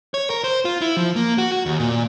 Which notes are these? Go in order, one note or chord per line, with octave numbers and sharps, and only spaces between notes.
C#5
A#4
C5
F4
E4
F3
A#3
F#4
F#4
D#2
A#2